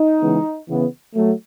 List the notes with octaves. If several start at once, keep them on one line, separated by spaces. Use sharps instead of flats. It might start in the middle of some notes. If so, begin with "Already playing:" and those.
Already playing: D#4
C#3 E3 G#3 B3
C#3 E3 B3
F#3 A3